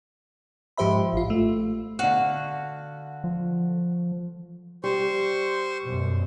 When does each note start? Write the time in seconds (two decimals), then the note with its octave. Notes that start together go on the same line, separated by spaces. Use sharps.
0.77 G#2 F3 G4 C5 E5 B5
1.13 A1 F4
1.30 A3
1.99 D3 F#4 F5
3.24 F3
4.84 G3 C5 C6 C#6
5.84 F#2 B2